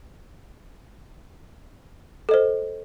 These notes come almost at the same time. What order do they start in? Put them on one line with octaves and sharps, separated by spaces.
A4 D#5 C5